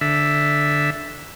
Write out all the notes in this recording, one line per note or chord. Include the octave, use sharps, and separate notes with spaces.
D3 E5